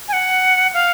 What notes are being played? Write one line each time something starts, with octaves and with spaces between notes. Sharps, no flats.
G#5
F#5
F5